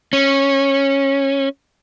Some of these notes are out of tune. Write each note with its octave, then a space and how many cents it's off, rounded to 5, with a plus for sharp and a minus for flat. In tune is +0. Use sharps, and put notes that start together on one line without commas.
C#4 -15